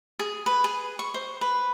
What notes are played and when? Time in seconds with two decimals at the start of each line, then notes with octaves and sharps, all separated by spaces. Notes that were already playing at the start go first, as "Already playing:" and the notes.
0.19 G#4
0.46 B4
0.64 G#4
0.99 C#6
1.14 C5
1.41 B4